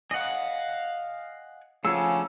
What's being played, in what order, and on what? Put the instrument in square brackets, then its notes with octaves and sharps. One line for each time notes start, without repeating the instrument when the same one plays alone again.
[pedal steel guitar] D#5 F#5 [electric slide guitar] F5 G#5
[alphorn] C#3 [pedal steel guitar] F3 G#4 A4 [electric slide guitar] A3 F#5 [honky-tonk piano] E6